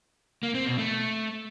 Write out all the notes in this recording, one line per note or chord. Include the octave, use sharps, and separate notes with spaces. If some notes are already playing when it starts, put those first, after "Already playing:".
A#3
C4
B2
A3